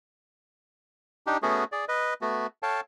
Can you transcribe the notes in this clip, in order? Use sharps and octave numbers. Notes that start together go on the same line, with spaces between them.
D4 D#4 G4
A3 B3 C#4 F#4 G#4
G#4 D5
B4 D#5
A3 B3 F#4
A4 C#5 F5 G5 A5